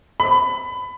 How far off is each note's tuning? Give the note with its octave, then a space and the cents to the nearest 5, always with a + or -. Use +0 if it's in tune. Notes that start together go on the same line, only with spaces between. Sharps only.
B5 +25